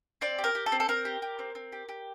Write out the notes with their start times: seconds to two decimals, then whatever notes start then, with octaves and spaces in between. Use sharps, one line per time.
0.21 C4 D5
0.39 G4
0.44 A#4
0.55 G4
0.66 A4
0.72 C4
0.80 A4
0.88 C4 A#4
1.05 G4
1.22 G4
1.39 C4
1.55 C4
1.72 G4
1.89 G4